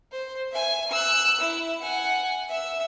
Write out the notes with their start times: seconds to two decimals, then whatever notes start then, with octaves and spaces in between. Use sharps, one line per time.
0.12 C5
0.51 E5 G#5
0.91 E6 F#6
1.41 E4
1.82 F#5 G#5
2.49 E5 E6